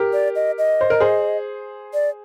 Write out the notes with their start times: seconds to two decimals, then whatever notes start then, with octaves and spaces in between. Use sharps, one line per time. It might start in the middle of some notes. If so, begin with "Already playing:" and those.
Already playing: G4 A#4
0.13 D5
0.36 D#5
0.58 D#5
0.81 C5
0.90 A#4
1.00 G#4 C5
1.94 D5